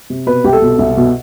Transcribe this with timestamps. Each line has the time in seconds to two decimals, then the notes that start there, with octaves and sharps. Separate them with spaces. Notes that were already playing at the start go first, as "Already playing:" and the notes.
0.10 C3
0.26 B2 B4
0.44 C2 G4
0.53 A4
0.62 B2
0.79 C2
0.97 B2